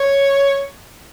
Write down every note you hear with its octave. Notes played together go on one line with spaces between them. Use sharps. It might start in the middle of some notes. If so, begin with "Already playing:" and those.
Already playing: C#5